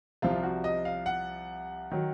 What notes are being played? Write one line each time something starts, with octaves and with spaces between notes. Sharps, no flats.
C2 C3 F3 F4
F#4
D#5
F5
F#5
D#3 F#3